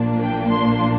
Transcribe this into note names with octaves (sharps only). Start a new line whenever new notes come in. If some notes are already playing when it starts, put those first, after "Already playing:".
Already playing: A#1 A#2 F3 A#3 D4
G5
C6